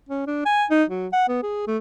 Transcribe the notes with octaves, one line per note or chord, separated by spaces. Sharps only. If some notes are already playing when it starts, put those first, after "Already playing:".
C#4
D4
G#5
D#4
F#3
F#5
B3
G#4
A3